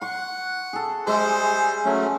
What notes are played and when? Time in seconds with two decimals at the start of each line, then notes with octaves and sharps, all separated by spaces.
0.01 F#5 C6 C#6
0.73 G#4 A4
1.07 G3 G#3 C5 E5
1.85 F#3 A3 C#4